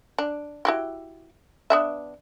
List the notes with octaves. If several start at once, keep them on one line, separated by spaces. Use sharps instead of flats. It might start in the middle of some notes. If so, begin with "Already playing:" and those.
D4
E4 F#4 G4
B3 D4 E5